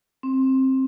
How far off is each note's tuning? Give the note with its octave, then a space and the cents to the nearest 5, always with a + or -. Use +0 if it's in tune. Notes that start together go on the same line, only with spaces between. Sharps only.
C4 +15